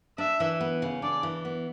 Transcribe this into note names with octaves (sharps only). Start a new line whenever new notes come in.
D4 E5
E3
B3
C#3
D4 D5
E3
B3